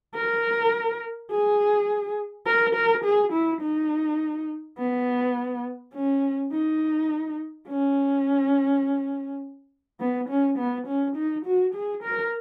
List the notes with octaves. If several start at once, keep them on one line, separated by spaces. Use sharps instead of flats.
A#4
G#4
A#4
A#4
G#4
E4
D#4
B3
C#4
D#4
C#4
B3
C#4
B3
C#4
D#4
F#4
G#4
A#4